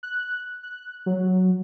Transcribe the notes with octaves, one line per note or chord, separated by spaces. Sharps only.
F#6
F#6
F#3